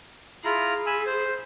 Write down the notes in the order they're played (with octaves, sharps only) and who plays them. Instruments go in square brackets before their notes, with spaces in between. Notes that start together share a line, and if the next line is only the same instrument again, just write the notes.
[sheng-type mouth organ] E4 F4 A#5 [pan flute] G#4
[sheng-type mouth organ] G#5 B5 E6
C5